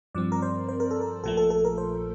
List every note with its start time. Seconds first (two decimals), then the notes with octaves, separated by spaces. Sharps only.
0.15 G2 F3 C4 D5
0.32 A#4
0.42 C5
0.68 C5
0.80 A#4
0.91 A4
1.01 A#4
1.24 A#1 A#2 F3 A3 A4
1.37 A4
1.50 A4
1.65 A#4
1.78 C5